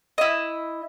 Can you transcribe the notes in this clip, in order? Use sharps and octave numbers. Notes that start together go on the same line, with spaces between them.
E4 D#5